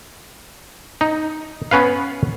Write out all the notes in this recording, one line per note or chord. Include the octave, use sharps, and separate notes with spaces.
D#4
B3 C#4 B4 F5